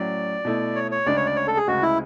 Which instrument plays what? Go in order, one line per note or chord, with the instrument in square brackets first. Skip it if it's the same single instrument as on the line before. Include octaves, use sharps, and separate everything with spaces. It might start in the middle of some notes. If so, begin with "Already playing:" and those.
Already playing: [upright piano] A2 F#3 C#4 [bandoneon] D5
[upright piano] B2 A3 E4
[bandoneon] C#5
C#5
[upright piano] D2 C#3 G#3 D4 [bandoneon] D5
[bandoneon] C#5
D5
C#5
A4
G#4
[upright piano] D2 C#3 G#3 [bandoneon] F#4
[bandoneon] E4